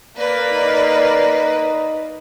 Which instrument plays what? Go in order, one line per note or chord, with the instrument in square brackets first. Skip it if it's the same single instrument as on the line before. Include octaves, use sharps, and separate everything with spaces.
[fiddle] A#3 B4 [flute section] A#4 D5
[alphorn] D#4